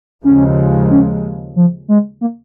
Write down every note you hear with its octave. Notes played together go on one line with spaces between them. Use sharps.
D#2 C#3 F3 G#3 C#4
C#4
F3
G#3
A#3